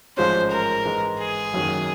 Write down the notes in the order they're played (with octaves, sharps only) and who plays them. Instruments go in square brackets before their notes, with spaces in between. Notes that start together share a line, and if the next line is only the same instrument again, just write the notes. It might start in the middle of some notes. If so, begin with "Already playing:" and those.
[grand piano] A1 G#2 F3 G#3 C#4 [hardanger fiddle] C5
[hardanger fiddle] A#4
[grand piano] G#2 E3 G#3
[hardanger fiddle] G#4
[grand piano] F#1 F#2 D#3 F#3